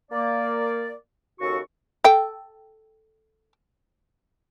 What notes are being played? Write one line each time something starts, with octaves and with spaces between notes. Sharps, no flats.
A#3 D5
D#2 C#3 F#4 A4 C#6
A4 G5